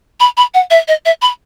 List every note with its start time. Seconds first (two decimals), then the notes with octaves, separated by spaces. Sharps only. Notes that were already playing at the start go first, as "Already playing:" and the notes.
0.20 B5
0.37 B5
0.54 F#5
0.70 E5
0.88 D#5
1.05 E5
1.22 B5